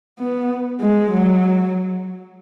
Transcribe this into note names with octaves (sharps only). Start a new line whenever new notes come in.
B3
G#3
F#3